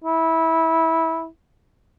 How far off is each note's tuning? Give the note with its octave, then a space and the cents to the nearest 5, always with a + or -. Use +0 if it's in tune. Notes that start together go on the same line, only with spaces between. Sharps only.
E4 -20